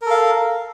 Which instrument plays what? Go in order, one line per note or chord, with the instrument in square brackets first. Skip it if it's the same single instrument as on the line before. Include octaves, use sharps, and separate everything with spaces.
[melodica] A#4
A4
F5